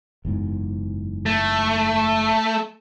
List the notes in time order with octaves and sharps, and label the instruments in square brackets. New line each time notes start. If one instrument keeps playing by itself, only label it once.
[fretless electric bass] F#1 E2 G#2
[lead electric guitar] A3